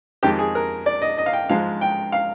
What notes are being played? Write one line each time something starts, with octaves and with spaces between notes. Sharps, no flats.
F2 D#3 G#3 G4
G#4
A#4
D5
D#5
D#5
F5
G5
G#2 F3 G#3 F5
G5
F5